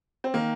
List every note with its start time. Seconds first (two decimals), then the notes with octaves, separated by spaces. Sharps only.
0.24 C4
0.34 D#3 A#3